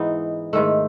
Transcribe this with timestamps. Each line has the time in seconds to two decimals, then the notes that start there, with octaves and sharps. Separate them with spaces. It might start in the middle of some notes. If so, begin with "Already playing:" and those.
Already playing: G#2 E3 B3 D#4
0.53 G#2 D#3 A3